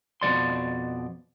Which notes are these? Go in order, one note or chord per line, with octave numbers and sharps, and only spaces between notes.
F2 B2 F3 D5 C6